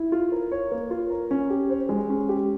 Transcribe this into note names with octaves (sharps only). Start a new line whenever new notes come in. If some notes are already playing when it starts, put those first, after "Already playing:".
Already playing: E4
F4
A#4
C#5
A#3
F4
A#4
C#4
G4
C5
G#3
C#4
G4